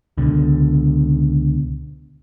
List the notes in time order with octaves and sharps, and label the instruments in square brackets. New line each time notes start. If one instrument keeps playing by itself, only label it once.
[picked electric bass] C#2 B2 D3